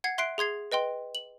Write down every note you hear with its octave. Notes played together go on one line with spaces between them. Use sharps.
F#5 G#6 C7
E5 C6 F#6 C7 D7
G#4 C6 G#6 C7
B4 D#5 G5 C6
F#7